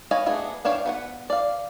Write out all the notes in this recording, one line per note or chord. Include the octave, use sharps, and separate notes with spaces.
B4 C#5 D#5 F5 G#5
A3 B3 D4 G#4
E3 D4 C#5 F5 G5
B3 B4 F#5
D5 F5